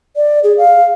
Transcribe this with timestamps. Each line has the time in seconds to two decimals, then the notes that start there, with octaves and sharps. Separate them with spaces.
0.16 D5
0.44 G#4
0.58 F5